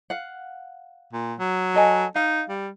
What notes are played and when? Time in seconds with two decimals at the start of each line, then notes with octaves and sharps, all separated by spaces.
0.10 F5 F#5
1.13 A#2
1.39 F#3
1.74 A4 D#5 G#5
2.15 D#4 F5
2.49 G3